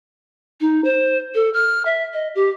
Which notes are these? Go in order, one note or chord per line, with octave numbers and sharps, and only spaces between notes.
D#4
C5
A4
F6
E5
D#5
G4